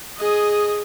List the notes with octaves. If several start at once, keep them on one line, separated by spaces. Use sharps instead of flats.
G#4 D#5